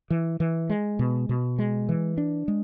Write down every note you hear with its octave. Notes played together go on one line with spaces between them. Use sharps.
E3
E3
G#3
B2
B2
G#3
E3
D4
G#3